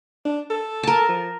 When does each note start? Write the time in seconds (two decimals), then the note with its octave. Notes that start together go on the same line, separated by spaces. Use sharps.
0.25 D4
0.50 A4
0.83 A#4 A5
1.09 F3